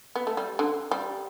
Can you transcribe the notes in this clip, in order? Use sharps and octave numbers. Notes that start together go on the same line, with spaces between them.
B3
A3
G3
D3
G3